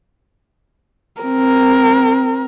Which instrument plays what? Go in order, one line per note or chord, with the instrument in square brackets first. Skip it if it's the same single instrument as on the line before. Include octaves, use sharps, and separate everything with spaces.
[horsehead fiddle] C4 A#4